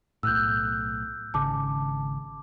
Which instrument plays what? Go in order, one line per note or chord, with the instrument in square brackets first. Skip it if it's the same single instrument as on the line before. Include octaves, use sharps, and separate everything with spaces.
[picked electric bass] B1 A2 [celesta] E6 F#6 G6
[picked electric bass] G#1 C#3 [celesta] A5 D6